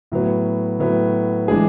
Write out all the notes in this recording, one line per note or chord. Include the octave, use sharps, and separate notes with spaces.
A2 F#3 B3
A2 F#3 B3
E3 G#3 D4 G#4